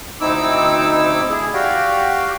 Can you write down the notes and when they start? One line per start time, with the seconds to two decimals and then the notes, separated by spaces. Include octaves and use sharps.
0.21 D2 C4 D#4 E4 D6 E6
1.30 E4 G#4
1.54 F#4 G4 D5 F5 G5